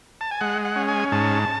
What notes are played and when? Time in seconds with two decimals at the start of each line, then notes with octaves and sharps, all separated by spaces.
0.21 A5
0.31 G#5
0.41 G#3 F#5
0.65 F#5
0.76 C#4
0.88 G#5
1.12 G#2 A5